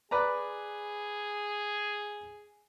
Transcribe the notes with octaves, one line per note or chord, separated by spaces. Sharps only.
G#4 B4 D5 A#5